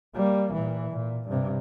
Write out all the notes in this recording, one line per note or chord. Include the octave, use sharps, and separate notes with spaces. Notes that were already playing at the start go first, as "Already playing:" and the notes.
G3 A#3
A#2 E3
A#2
G2 C3